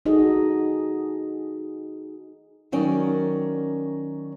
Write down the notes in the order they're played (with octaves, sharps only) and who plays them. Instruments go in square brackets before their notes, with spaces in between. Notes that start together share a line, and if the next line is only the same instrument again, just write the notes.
[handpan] D#4 F#4 G#4 A4 D#5
[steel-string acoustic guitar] D#3 F#3 C#4 A#4 D5